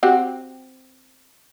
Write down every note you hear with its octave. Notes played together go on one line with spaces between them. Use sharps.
C4 F#4 G4